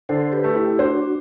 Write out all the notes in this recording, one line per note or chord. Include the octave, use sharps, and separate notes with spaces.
D3 A4 C5
G4 B4
A3
E4 G4
D4 F#4 C5